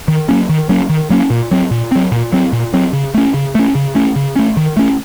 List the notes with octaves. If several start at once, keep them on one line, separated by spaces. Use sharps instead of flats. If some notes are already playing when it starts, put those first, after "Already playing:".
D#3
F#3 A#3 C#4
D#3
F#3 A#3 C#4
D#3
F#3 A#3 C#4
A#2
F#3 C4
A#2
F#3 C4
A#2
F#3 C4
A#2
F#3 C4
C#3
A3 C#4
C#3
A3 C#4
C#3
A3 C#4
C#3
A3 C#4
D#3
A3 C#4